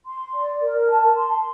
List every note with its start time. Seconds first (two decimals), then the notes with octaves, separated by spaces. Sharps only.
0.06 C6
0.34 D5
0.62 A#4
0.89 A5
1.17 C6